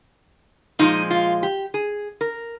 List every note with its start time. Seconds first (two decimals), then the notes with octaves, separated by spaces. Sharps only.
0.79 A#2 F3 G#3 D#4
1.10 F4
1.43 G4
1.74 G#4
2.21 A#4